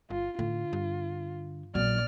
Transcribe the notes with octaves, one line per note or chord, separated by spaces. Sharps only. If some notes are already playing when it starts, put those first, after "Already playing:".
G1 F4
A2 D3 F4
G2
A#1 F#3 D5 F6